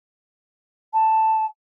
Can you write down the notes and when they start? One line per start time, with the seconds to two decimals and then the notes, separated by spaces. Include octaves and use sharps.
0.93 A5